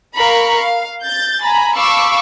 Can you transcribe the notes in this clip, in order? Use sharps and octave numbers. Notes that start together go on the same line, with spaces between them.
A#4 F5 A#5 B5 C#6
F5
G6 A6
G#5 A#5 B5
F5 A5 B5 C#6 D6 E6